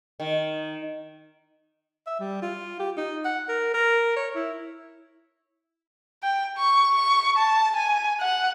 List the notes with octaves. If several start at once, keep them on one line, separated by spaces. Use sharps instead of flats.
D#3
E5
G3
F4
G4
D#4
F#5
A#4
A#4
C#5
E4
G5
C#6
C#6
A5
G#5
F#5